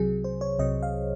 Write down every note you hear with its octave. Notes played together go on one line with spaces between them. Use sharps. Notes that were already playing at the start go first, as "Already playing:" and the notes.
Already playing: C2 C3 F#3 G#4
C5
C#5
C2 C3 F#3 D#5
F5